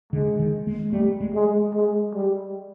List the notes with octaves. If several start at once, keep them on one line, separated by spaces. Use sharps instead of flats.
D3 G#3
D#3
G#3
G3 A3
G#3
G#3
G#3
G3